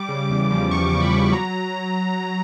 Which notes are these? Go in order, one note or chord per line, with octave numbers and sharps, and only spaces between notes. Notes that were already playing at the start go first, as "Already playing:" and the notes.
Already playing: G3 D6
C#3
E2
F3
E2 C#6
C#3
B5
C#3
F#3 A#5